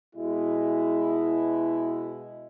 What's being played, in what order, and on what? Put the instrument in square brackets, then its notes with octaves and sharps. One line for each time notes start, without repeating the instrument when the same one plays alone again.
[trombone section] B2 G#3 [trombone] E4